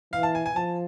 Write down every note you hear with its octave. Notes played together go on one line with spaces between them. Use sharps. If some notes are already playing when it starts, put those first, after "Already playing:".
E3 F5
A5
G#5
G#5
F3 A5